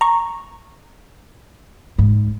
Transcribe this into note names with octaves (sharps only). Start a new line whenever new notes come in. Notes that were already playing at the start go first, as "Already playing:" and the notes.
A#5 C#6
G#2